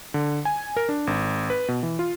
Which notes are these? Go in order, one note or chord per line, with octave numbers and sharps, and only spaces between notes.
D3
G#5
A#4
D4
G#1
B4
B2
E3
F4